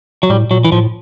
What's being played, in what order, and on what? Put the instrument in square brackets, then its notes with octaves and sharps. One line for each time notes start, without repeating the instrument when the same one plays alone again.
[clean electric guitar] F#3
[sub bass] A2 [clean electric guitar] G3
[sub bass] A#2 [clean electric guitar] F#3
[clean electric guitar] E3
[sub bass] A2 [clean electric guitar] F3